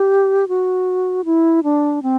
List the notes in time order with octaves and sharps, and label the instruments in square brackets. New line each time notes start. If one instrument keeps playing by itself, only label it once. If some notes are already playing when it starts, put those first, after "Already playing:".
Already playing: [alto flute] G4
F#4
E4
D4
C4